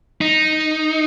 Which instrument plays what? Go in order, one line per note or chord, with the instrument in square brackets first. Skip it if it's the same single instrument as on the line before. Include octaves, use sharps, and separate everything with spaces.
[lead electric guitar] D#4